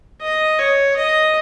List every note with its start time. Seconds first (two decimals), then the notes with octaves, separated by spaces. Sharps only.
0.22 D#5
0.59 C#5
0.97 D#5